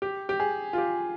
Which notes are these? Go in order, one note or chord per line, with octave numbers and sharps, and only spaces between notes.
G4
G4
G#4
F4
G4